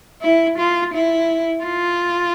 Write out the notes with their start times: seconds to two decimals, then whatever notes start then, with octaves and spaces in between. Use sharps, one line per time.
0.22 E4
0.58 F4
0.94 E4
1.64 F4